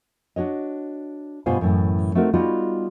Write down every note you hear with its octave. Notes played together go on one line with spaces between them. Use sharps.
D4 F#4 C#5 D#5
G2 B2 G3 F4 C5 G#5
F#2 A2 E3
A3 C4 D#4 F#4 A#4
G3 G#3 B3 D#4 F4 F#4